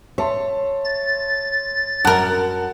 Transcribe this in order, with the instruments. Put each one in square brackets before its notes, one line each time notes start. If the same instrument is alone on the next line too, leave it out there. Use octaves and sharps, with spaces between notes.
[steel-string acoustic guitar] C#5 [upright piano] E5 A5 C6
[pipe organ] A6
[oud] F#2 A#4 [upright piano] F#5 A5 F#6